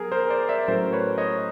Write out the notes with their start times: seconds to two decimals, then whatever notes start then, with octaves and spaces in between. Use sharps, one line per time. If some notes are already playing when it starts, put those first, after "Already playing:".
Already playing: F#3 B3 G#4 A#4
0.12 A#4 C5
0.30 C5 D5
0.49 D5 E5
0.68 A2 F#3 A3 C#4 A#4 C5
0.93 B4 C#5
1.18 C#5 D#5